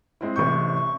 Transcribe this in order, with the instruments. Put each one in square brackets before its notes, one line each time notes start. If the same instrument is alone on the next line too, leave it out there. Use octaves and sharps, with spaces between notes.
[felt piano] G#3 C4 E4
[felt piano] A1 C3 G6 [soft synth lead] C#6